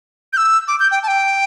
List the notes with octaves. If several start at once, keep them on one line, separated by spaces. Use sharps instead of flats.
G6
E6
D6
G6
G5
A5
G5